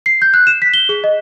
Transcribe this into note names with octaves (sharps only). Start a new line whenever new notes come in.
C7
G6
F#6
E7
B6
G7
G#4
D#5